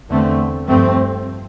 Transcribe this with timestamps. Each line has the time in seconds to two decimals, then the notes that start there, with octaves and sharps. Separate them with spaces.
0.09 E2 D3 A3 C4
0.67 G2 F3 A3 C4